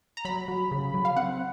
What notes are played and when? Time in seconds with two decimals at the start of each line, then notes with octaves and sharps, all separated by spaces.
0.17 A#5
0.25 F#3 B5
0.48 F#3
0.71 C#3
0.94 F#3
1.05 F5
1.17 C4 F#5